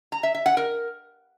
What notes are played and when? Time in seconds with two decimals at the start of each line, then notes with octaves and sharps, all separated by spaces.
0.12 A#5
0.23 E5
0.35 E5
0.46 F#5
0.57 A#4